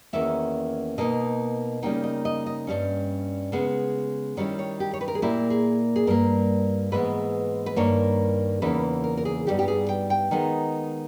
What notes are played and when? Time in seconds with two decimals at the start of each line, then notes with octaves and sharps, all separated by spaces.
0.13 E2 D#3 A#3 C#4 E4 E5
0.98 B2 A#3 D#4 D#5
1.83 C#3 G3 A#3 D#4 G5
2.04 D#5
2.25 D#5
2.46 D#5
2.67 G2 D#3 G3 C#4
3.52 C#3 G#3 B3
4.37 D#3 G3 C#4 E4 C#5
4.59 C#5
4.80 G4
4.94 C#5
5.01 B4
5.08 A#4
5.15 G#4
5.22 A#2 A#3 E4 G4
5.50 G#4
5.96 G#4
6.07 G2 G3 A#3 A#4
6.92 G#2 E3 G#3 B3 B4
7.66 B4
7.76 G2 D#3 A#3 C#5
8.62 E2 C#3 E3 A#3 D#4 B4
9.04 A#4
9.17 A#4
9.25 G#4
9.47 G2 G3 B3 D#4 G4
9.59 G4
9.68 G#4
9.89 G5
10.10 G5
10.31 D#3 G#3 B3 D#4